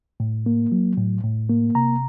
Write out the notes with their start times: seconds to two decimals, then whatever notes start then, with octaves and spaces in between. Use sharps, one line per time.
0.20 A2
0.46 A#3
0.72 F#3
0.98 A2
1.23 A2
1.49 A#3
1.75 C3 A#5